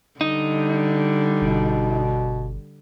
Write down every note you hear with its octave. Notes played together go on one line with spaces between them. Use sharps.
D3 G3 D#4
G1 B2